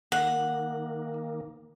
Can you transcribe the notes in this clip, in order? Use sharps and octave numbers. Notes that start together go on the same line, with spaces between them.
D#3 A#3 F#5